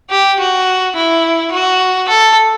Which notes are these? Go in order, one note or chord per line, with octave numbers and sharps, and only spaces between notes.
G4
F#4
E4
F#4
A4